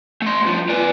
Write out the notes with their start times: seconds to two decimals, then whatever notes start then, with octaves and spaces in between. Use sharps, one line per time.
0.22 A3 C6
0.42 G2 F3
0.69 B3 D5